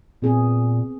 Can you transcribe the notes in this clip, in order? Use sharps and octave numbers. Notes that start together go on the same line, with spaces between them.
A#2 B3 C4 G#4